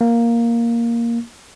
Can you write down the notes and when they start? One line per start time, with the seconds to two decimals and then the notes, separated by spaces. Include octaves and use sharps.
0.01 A#3